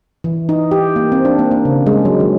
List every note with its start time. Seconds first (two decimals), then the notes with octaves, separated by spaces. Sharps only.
0.24 E3
0.49 D#4
0.71 G4
0.96 A#3
1.12 C4
1.25 D4
1.39 A#3
1.51 A#3
1.65 C#3
1.87 G#3
2.05 F#3
2.20 D#3